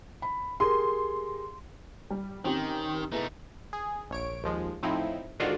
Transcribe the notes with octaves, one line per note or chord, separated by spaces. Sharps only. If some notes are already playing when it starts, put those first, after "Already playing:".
B5
G4 G#4 A#4 C6
G3
D#3 C4 C#4 G4
A3 B3 D#4 E4 G#4
G#4
A#1 C#5 D7
D#2 F3 G#3
A2 F3 C4 D#4 E4
G#2 D3 D#3 D4 F4 F#4